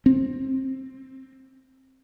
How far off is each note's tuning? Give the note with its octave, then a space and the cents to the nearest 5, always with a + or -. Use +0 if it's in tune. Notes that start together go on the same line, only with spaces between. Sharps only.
C4 +15